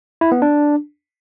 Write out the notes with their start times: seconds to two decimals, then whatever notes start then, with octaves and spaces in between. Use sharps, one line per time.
0.21 E4
0.32 B3
0.42 D4